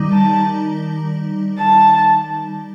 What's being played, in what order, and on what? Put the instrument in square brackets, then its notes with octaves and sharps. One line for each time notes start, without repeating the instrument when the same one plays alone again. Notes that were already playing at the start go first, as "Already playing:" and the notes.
Already playing: [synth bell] D#3 G3 D#4
[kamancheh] A5
A5